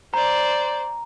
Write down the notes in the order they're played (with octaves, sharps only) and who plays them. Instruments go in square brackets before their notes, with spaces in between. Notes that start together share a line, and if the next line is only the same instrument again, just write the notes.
[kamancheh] C5 D5 [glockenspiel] A#5